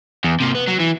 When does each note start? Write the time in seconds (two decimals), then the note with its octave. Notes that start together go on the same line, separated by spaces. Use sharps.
0.24 E2
0.40 C3 A#3
0.55 B3
0.67 F#3
0.80 E3